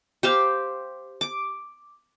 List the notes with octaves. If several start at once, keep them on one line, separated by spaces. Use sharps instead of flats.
G4 C5 F5
D6